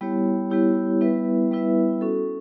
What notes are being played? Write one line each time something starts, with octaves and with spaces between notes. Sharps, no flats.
G3 B3 E4 G4 C#5
G3 B3 E4 G4 C#5
G3 B3 E4 B4 E5
G3 B3 E4 B4 E5
C#4 F#4 A4